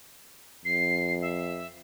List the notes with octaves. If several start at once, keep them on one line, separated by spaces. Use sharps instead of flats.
F2 C7
E5